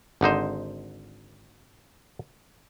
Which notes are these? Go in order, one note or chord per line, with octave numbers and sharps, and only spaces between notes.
G#1 D3 D#4 C5